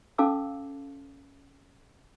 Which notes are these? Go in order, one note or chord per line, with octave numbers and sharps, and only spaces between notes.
C#4 A4 F5 A5 D6 E6